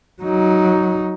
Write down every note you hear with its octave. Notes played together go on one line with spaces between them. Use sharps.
F#3 D#4